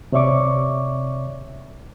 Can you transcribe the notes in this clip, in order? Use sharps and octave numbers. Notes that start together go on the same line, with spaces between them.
C3 C#5 D5 E5 C#6 D6